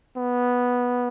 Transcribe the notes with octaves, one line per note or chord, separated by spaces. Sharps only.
B3